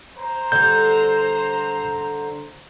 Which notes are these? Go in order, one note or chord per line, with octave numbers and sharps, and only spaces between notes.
C5 A#5
D3 G3 G6